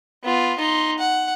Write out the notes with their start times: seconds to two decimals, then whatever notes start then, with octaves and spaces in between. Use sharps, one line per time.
0.24 B3 F4
0.58 D#4 C6
0.99 F#5